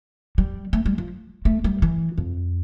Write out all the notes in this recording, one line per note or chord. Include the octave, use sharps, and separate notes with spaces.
G3
A3
G3
F3
A3
G3
E3
F2